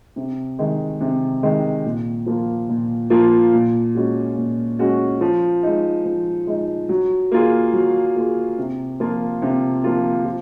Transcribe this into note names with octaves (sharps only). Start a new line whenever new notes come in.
C3
D#3 G#3
C3
D#3 G#3
A#2
F3 A#3 F4
A#2
F3 A#3 F4
A#2
G#3 C#4 F#4
A#2
G#3 C#4 F#4
F3
G#3 D#4
F3
G#3 D#4
F#3
A#3 F4 G#4
F#3
A#3 F4 G#4
C3
F3 A#3 F4
C3
F3 A#3 F4
F3